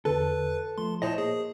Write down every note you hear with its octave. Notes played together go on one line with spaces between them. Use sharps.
E2 D3 A4 B4
F3 A3 C6
A#2 E4 C5 C#5 D#5 A5 A#6
A#3 G#4